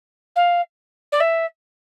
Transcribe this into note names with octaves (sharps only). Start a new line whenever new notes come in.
F5
D5
E5